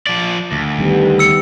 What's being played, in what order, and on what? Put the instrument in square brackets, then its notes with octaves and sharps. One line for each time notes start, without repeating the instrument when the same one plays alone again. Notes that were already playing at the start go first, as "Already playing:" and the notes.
[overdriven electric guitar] F3 D5
D2
[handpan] D#3 G3 B3
[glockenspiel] E6 C#7